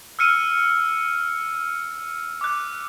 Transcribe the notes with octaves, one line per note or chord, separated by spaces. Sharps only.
E6 F6 C#7 D#7
D6 F#6